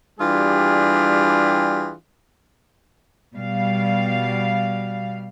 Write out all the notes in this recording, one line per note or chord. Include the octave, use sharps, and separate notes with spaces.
E3 G3 D4 F4 G4 G#4
B2 G3 F5